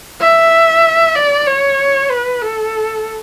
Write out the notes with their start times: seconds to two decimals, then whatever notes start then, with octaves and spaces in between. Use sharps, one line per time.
0.21 E5
1.15 D5
1.47 C#5
2.10 B4
2.42 A4